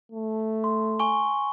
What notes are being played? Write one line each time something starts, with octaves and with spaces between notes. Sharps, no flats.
A3
C6
G#5 C#6 G7